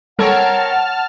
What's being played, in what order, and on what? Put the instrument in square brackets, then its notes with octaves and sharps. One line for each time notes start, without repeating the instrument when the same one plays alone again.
[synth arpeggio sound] G3 A4 [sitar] C4 A#4 C#5 [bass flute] F#5 [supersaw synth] A5 F6